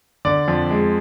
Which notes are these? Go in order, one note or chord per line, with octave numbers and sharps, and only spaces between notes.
D3 D5
F2
G#3